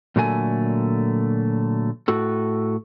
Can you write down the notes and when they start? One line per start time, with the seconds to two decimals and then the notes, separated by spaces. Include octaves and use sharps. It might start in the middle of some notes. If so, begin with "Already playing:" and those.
0.16 A#2 D3 F#3 A3 B4 G#5
2.08 A2 F#4 A4